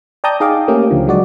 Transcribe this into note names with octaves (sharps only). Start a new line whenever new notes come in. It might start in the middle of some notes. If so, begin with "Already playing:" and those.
D5 G5 A5 A#5 D#6 G6
D#4 G#4 D#5 F5 G5 D6
A3 A#3 C#4 G4
C#2 D3 F3
F#3 G#3 F#4 D5